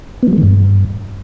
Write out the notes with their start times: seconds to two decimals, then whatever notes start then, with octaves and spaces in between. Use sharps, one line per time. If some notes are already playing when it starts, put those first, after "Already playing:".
0.23 B3
0.28 F#3
0.33 G#3
0.38 D#3
0.43 G2